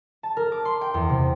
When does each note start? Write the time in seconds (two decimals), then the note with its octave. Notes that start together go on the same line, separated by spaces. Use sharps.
0.23 A5
0.37 A#4
0.52 D6
0.65 C6
0.81 G5
0.94 E2
1.09 C3